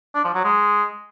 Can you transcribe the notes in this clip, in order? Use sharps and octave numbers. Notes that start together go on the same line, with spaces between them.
D4
F3
F#3
G#3